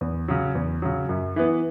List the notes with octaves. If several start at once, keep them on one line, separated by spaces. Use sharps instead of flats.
E2
C#3 F#3
E2
C#3 F#3
F#2
E3 B3